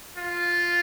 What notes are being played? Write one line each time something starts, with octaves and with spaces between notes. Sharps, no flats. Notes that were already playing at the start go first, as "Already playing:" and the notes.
F4